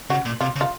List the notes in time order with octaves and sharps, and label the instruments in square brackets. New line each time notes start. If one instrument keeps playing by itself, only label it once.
[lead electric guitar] C#3 [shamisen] F#4
[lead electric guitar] A#2
[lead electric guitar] C3 [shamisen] F4
[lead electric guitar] C#3
[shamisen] F4